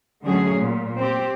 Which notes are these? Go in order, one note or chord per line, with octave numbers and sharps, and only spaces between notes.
D3 F#3 A3 C#4 G#4
A#2
C4 G4